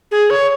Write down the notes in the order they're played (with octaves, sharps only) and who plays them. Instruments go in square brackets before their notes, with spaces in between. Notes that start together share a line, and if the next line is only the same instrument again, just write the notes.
[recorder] G#4
C#5